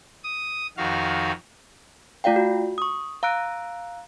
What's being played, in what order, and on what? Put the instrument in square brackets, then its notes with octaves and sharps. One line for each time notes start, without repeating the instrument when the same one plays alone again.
[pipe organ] D#6
F2 D#3 F#4 F5
[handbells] A3 F4 D5 F5 G5
F#4
C#6 D#6
F5 A#5 E6 F#6 D7